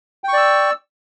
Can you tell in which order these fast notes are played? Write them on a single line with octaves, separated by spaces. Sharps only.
G5 C#6 D5 E6